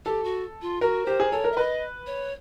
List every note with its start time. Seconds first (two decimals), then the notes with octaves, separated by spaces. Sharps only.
0.05 G4 A4
0.24 F#4
0.62 F4
0.81 F#4 A#4
1.06 G4 C5
1.20 G#4
1.31 A4 C#5
1.44 A#4
1.52 E5
1.57 B4 D#5
2.07 C#5